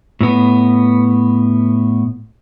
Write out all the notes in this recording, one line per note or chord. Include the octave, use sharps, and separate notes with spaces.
A2 B3